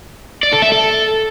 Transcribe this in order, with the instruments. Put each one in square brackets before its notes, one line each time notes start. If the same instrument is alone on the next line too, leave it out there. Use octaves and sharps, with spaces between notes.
[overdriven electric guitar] D5
A4
E5
A4